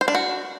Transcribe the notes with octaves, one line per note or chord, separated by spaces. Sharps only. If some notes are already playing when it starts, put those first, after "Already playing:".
C5
D4
F#4